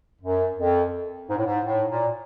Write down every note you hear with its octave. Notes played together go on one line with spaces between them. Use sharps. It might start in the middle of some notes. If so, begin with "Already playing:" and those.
F#2
F2
G#2
A2
G#2
A2
A#2